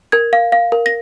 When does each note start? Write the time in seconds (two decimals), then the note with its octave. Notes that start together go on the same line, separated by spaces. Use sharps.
0.12 A#4 G#6
0.33 F5
0.52 F5
0.72 A#4
0.86 A#6